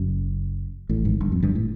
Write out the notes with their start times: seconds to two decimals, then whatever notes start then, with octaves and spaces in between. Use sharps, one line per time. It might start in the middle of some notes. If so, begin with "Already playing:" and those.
Already playing: F#1 F#2
0.89 A1 A2
1.05 G#1 G#2
1.20 G1 G2
1.32 F2
1.43 G1 G2
1.55 A2